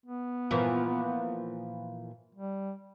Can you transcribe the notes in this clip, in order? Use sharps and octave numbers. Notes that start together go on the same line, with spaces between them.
B3
A#2 E3 F3
G3